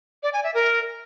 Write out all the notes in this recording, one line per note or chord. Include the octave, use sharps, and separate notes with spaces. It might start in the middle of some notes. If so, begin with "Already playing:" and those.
D5
G#5
E5
A#4